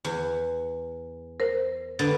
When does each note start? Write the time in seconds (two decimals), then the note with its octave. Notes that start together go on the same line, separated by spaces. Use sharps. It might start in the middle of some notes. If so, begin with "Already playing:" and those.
0.05 E2
1.40 A#4 C5
1.99 D3 B3 A6